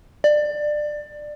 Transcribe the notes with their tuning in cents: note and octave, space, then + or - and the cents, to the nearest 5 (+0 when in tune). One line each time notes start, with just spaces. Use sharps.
D5 +20